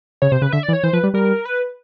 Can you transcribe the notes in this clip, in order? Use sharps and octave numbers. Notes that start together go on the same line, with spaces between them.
C#3 C#5
C3 C5
C#3 B4
D3 E5
D5
E3
C#5
E3 C5
F3 B4
G3
G3 A#4
B4